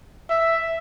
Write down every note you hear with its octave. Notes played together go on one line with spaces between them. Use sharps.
E5